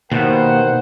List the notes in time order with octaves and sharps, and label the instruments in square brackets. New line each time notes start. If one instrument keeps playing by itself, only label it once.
[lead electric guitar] D#2 [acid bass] B2 [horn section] A#4 C5 F#5